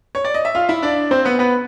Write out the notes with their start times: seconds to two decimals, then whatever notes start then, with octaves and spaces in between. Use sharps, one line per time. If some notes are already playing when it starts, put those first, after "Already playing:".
0.15 C#5
0.25 D5
0.34 D#5
0.45 E5
0.55 F4 F5
0.69 E4 E5
0.82 D4 D5
1.11 C4 C5
1.25 B3 B4
1.39 B3 B4